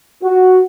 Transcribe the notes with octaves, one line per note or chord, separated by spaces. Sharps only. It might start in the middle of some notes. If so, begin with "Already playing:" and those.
F#4